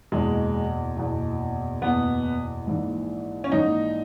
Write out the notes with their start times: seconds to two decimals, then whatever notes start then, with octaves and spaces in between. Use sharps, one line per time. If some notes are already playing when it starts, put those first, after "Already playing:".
0.12 F#1 E2 B2 G#3
0.97 F#1 E2 B2
1.82 F#1 E2 B2 B3
2.67 A#1 G#2 E3
3.44 C#4
3.52 A#1 G#2 E3 D#4